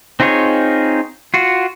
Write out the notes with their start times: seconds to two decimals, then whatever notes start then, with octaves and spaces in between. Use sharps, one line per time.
0.20 C4 D#4 F4 G#4 C#5
1.34 F4 F#4